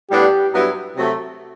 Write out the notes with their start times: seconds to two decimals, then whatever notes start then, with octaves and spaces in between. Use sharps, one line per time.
0.10 A2 G3 B3 D4 G4
0.54 G2 F#3 B3 E4
0.96 C3 F#3 A3